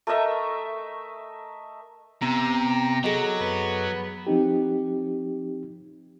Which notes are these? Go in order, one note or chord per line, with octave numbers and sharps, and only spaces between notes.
A3 A#4 D#5 E5
F#1 C3 B3 A#5
F#3 G#4 A4 D#5
F#2 B3
F3 C4 D#4 G4